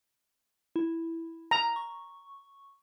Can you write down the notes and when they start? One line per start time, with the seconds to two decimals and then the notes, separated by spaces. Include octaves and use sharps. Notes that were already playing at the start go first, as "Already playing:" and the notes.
0.76 E4
1.51 A#5
1.76 C#6